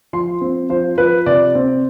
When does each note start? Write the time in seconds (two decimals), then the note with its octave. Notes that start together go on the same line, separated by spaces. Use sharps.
0.13 F3 C6
0.41 C4
0.69 F3 C5
0.98 F3 B4
1.26 C3 D5
1.55 C4